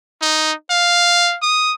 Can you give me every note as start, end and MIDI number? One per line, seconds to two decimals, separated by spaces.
0.22 0.53 63
0.70 1.37 77
1.42 1.74 87